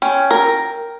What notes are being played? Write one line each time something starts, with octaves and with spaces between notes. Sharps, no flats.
C#4 G5
A#4